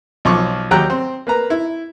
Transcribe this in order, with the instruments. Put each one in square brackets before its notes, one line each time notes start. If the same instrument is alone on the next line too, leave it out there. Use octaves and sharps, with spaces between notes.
[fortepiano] B1 F3 C#6 D6
D#2 F#3 G4 G5 A#5 F#6
C4
A#3 B4 A#5
E4